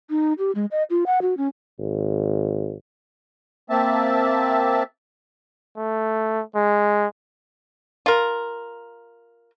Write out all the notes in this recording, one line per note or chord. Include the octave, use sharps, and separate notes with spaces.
D#4
G4
G#3
D#5
F4
F#5
F#4
C#4
G#1
A#3 C4 E5 A5
A3
G#3
F4 A#4